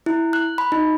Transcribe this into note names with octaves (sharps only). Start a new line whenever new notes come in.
E4
F#6
B5
D#4